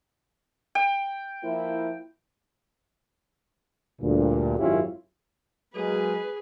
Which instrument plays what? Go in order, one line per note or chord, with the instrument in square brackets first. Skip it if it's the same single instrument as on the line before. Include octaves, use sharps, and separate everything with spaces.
[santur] G5
[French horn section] F3 A#3 E4
[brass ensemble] D2 G2 A#2
G#1 F#2 C#4 E4 F4 G4
[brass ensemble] F#3 G#3 A#3 [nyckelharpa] G#4 [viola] B4